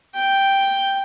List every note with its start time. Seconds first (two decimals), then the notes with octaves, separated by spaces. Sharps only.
0.14 G5